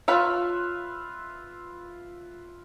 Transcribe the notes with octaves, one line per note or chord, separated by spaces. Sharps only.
F4 B4 C#5 E5 F5 B5